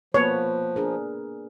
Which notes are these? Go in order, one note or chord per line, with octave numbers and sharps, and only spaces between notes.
F3 A#3 B3 B4 C#5
D4 G#4 A#4